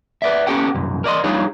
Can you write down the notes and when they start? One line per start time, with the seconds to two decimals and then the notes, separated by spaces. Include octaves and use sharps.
0.22 B4 D5 E5
0.47 B3 C#4 G4 A4 F#5 G5
0.74 C2 F#2
1.04 A#4 D5 D#5 C6
1.24 G3 D4 D#4 F4 G#4 C#5